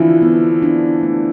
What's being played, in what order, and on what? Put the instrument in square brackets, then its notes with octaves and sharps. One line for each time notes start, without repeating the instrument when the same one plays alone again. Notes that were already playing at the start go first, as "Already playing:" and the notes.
Already playing: [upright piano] D3 E3 F3 [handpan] C4 E4
[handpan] B3
D4
A3